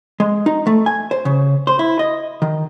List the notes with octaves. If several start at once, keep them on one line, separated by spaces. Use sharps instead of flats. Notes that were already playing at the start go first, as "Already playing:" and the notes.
G#3
D#4
A3
G#5
C5
C#3
C5
E4
D#5
D#3